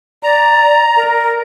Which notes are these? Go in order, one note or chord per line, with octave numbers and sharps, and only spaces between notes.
D5 A#5
A#4